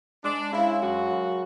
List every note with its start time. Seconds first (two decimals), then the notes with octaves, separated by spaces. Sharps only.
0.24 G#3 D4
0.53 C#3 E4
0.81 F#2 F#4
1.11 F#2